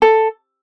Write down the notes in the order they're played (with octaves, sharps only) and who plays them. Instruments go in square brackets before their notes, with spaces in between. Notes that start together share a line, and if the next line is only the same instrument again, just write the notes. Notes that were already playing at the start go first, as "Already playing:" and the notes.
[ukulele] A4